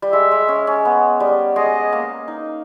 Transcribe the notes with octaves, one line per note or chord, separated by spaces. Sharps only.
G3
G#3 E5
G#3
C#4
C#4
B3
G3
G#3 D#5
A#3
D#4